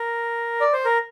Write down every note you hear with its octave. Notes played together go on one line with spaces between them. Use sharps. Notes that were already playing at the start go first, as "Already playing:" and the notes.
Already playing: A#4
D5
C5
A#4